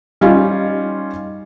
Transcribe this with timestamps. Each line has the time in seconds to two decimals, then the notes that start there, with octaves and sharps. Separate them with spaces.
0.21 G3 C#4 D#4 F4